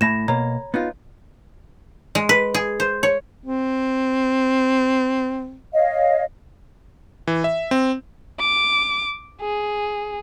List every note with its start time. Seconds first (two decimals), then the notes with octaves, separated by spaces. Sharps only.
0.01 A2 A3 A5 B5 A#6 E7
0.28 B2 A#3 C#5 A#5
0.74 B3 D#4 F4
2.15 G#3
2.29 B4
2.54 G#4
2.80 C5
3.03 C#5
3.44 C4
5.73 C#5 D#5 F5
7.27 E3
7.44 E5
7.71 C4
8.40 D6
9.41 G#4